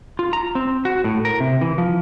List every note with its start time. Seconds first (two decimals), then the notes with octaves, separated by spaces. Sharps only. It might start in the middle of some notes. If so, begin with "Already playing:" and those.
0.19 F4
0.33 A#5
0.55 C4
0.85 F#4
1.04 A2
1.25 A#4
1.40 C3
1.61 E3
1.78 F3